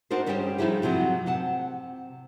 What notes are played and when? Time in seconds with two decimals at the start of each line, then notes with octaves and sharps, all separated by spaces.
0.10 D4 D#4 F#4 A#4 C5
0.26 G2 G3 C#4 G4 G#4 C5
0.58 F3 G3 D#4 E4 G4 G#4
0.82 F#2 C3 F3 F#3
1.26 C3 F#5 A5